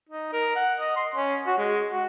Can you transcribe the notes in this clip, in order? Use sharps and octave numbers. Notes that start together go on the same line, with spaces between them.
D#4
A#4
F#5
D#5
C6
C#4
F#4
G#3
F#4